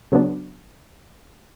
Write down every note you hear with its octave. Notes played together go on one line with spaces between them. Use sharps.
C#3 F#3 B3 D4